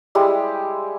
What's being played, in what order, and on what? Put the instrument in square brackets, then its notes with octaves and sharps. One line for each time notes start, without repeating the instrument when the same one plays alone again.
[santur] G3 G#3 E4 G4